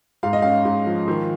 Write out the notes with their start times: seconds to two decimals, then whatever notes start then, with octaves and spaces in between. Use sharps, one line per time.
0.23 G#2 F5
0.33 D#5
0.42 C#4 F5
0.65 G#2
0.87 F3
1.08 D#3